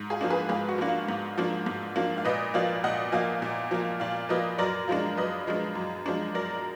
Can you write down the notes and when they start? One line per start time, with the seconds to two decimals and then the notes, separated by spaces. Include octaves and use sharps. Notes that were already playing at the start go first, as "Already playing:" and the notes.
Already playing: G#2
0.10 F4 G#4
0.21 F3 A#3 D4
0.30 G#4 B4
0.49 G#2 F4 G#4
0.69 F#4
0.78 F3 A#3 D4
0.88 F4
1.08 G#2
1.38 F3 A#3 D4
1.66 G#2
1.96 F3 A#3 D4
2.18 F5
2.25 A#2 B4 D#5
2.54 F3 A#3 D5 F5
2.84 A#2 D#5 F#5
3.12 F3 A#3 F5 G#5
3.42 A#2
3.71 F3 A#3
4.00 A#2 D5 F5
4.29 F3 A#3 B4 D#5
4.58 F#2 A#4 D5
4.88 F3 G#3 D4 F4
5.17 F#2 B4 D#5
5.47 F3 G#3 D4
5.75 F#2
6.06 F3 G#3 D4
6.35 F#2 A#4 D5